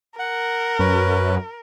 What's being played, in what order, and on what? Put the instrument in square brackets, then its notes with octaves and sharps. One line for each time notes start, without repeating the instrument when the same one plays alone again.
[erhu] A#4 [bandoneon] F#5
[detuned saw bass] F#2 [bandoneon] C#4 B4